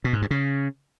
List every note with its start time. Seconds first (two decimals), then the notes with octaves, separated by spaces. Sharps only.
0.04 B2
0.13 G#2
0.22 G2
0.31 C#3